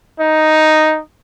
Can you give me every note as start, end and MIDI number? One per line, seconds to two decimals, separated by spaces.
0.19 1.00 63